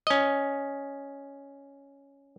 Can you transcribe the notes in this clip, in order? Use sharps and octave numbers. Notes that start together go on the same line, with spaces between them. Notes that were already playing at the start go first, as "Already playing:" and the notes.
C#4 D#5